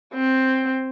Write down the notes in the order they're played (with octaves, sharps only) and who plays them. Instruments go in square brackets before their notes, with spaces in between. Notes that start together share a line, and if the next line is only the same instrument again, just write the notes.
[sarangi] C4